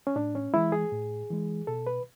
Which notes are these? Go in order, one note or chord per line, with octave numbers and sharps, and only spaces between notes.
C#4
A2 D4
C#4
E3 G#3 E4
G#4
A2
E3 G#3
B2 A4
B4